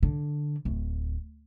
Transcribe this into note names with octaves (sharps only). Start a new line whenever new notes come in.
D3
D1